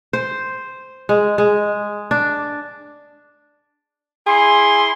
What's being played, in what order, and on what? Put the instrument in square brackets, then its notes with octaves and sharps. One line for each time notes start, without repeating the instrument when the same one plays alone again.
[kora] C5
G#3
G#3
D4
[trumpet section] E4 C6 [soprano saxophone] G#4